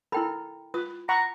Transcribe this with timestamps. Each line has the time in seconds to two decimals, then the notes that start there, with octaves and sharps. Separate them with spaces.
0.12 E4 A4 A#4 G5 B5
0.74 F4 B4 D#6
1.09 F#5 A#5 B5 C#6